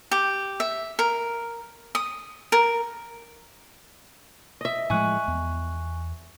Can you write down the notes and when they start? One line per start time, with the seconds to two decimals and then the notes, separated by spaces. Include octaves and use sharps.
0.11 G4
0.60 E5
0.99 A#4
1.95 D#6
2.52 A#4
4.61 D#5 E5
4.90 A2 F3 G#3 G#5 C#6 F#6
5.28 E2